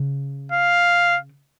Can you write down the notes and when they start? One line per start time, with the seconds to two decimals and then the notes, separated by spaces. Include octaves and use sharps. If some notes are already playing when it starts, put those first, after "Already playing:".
Already playing: C#3
0.52 F5